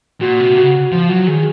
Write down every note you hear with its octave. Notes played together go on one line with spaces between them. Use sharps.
A#2 F#4
C3
C#3 F#4
F3 F4
F#3 F#4
D#3 G#4